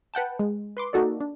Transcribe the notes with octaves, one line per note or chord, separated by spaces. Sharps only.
B4 F#5 G5 A5
G#3
B4 C6 D6
A#3 D#4 F#4 A4 D5
D4